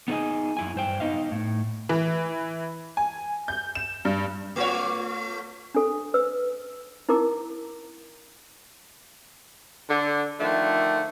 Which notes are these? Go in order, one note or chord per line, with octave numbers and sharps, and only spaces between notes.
B3 D#4 G#4 B4 D#5 G#5
F#2 E4 G#5
G2 C5 G5
B3 D#4 D#5 F5
A2
E3
G#5
G6
E7
G2
A3 F4 C#5
D4 A4
B4 E6
D#4 E4 A#4 D6
D3
D3 D#3 F3 A3